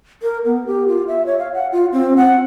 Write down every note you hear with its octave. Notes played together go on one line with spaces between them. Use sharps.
A#4
B3
G4
F4
E5
C#5
F5
F#5
F4
C4
F#5